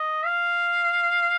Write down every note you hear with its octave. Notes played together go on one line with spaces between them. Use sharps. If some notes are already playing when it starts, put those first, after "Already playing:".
Already playing: D#5
F5